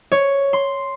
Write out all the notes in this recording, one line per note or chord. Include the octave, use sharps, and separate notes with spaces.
C#5
C6